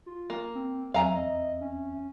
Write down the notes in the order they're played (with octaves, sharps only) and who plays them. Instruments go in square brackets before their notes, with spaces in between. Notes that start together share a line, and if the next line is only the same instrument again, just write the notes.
[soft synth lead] F4
[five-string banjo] A#3
[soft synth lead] C4
[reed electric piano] E2 C4 E5 [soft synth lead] F#3 [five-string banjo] F5 G#5 A#5
[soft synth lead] D#5
C#4